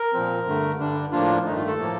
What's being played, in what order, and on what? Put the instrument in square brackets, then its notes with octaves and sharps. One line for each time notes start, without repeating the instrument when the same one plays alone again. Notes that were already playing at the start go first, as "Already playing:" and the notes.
Already playing: [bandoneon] A#4
A#2 F3 C4
G2 D3 A3
G2 D3 G3 D4
A2 F3 A#3 D4 F4
G2 D#3 A3 D#4
F4
A4
A2 F3 A#3